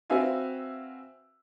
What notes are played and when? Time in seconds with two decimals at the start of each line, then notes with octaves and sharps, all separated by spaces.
0.10 C4 F#4 B4 E5 F5 G#5